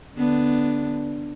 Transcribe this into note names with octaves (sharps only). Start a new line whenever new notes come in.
D3 B3 D4